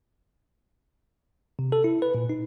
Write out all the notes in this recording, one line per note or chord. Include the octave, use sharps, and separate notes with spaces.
C3
A4
E4
B4
A#2
D#4